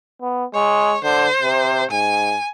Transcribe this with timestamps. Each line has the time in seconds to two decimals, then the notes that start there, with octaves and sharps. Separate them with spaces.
0.22 B3
0.54 G#3 C#5
1.04 D3 C5
1.42 C3
1.91 G#2 G#5